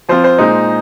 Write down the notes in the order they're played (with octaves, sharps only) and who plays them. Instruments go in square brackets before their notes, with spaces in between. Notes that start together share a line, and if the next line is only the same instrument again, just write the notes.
[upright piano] F3 C4 F4 C5
C5
A#2 G#3 D#4